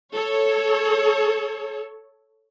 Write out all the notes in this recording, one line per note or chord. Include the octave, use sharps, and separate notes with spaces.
A4 C#5